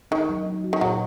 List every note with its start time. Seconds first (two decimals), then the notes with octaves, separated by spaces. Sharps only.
0.11 D#3 D#4
0.29 F#3
0.46 D#4
0.64 F#4
0.73 D#3
0.81 A#2 F#3